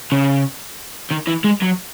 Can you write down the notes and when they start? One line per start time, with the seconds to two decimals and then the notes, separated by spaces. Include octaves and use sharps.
0.12 C#3
1.11 D#3
1.27 E3
1.44 G#3
1.62 F#3